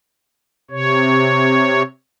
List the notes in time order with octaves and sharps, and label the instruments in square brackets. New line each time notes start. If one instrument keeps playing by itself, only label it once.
[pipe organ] C3 C#5